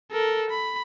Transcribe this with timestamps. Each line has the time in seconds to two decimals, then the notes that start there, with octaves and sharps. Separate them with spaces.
0.12 A4 A#4
0.50 B5